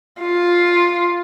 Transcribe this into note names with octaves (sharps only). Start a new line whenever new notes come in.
F4